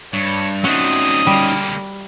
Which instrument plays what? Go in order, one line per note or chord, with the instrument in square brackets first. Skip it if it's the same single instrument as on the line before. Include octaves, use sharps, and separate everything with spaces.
[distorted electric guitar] G2 [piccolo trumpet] C#5
[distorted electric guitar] A3 C4 [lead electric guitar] C#4 D#4 [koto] F#4 [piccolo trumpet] D#6
[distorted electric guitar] D3 A#3 [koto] G3